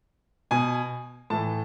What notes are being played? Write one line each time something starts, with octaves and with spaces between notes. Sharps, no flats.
B2 G#5
A2 E3 A5